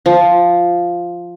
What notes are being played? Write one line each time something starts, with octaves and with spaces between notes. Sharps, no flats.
F3